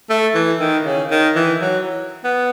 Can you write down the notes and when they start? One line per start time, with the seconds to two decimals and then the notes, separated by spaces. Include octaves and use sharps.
0.10 A3
0.35 E3
0.60 D#3
0.85 C#3
1.11 D#3
1.36 E3
1.61 F#3
2.24 B3